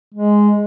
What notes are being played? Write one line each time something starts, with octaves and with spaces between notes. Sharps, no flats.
G#3